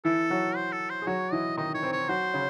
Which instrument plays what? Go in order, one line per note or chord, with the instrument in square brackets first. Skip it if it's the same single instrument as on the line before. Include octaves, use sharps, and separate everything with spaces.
[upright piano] E3 E4 [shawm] A4
[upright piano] F#3 F#4
[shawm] C5
A4
C5
[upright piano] G#4
[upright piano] F#3 F#4 [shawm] C#5
[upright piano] E3 E4 [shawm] D#5
[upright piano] D#3 D#4 [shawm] D#5
[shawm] C#5
[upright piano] C4 C5
[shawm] C#5
[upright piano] F#3 F#4 [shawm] C5
[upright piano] C#3 C#4